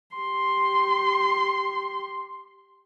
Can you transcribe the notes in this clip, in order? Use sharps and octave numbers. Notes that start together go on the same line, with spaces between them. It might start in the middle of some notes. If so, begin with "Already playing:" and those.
G4 C6